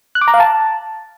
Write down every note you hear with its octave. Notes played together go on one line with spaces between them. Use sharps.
F#6
D6
A#5
F5
A5